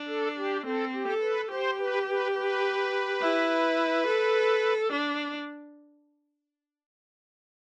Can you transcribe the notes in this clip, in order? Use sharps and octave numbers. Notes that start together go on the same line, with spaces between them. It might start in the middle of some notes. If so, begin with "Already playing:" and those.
Already playing: D4
A4
G4
C4 A4
G4
A4
B4
G4 C5
B4
B4
B4
E4
A4
D4